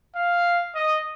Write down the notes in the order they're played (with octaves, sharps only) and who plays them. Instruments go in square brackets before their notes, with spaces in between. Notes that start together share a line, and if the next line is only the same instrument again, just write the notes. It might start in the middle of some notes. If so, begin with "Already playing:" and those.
[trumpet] F5
D#5